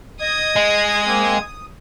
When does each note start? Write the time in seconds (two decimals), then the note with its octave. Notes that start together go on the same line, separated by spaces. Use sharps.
0.21 D#5 D#6 G#6
0.56 G#3
1.06 A#3 C4
1.42 D#6